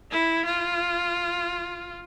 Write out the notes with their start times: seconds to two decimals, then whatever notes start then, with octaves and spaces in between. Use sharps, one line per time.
0.11 E4
0.46 F4